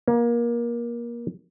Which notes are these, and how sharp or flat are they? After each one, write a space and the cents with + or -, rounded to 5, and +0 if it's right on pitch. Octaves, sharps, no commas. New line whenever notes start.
A#3 +25